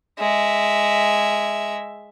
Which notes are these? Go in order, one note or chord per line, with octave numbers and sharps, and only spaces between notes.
G#3 E5